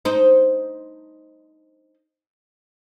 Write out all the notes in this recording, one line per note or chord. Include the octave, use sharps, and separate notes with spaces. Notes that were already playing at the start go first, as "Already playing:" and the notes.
D#4 C5